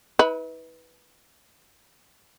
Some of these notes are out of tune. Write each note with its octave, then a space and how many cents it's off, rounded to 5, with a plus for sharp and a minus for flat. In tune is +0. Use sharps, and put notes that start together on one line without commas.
E4 -45 B4 -5